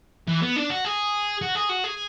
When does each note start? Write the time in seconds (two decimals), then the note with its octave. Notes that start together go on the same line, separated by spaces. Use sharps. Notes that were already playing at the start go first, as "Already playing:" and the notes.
0.28 E3
0.42 B3
0.56 D4
0.70 F#4
0.85 G#4
1.42 F#4
1.55 G#4
1.70 F#4
1.84 G#4